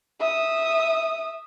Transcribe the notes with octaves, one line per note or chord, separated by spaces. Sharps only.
E5 D#6